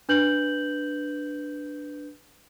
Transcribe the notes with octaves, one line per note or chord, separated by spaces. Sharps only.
D4 B4 G6 F#7